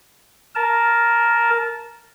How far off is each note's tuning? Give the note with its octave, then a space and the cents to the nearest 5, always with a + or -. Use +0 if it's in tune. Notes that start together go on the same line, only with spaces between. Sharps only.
A#4 +0 A5 -15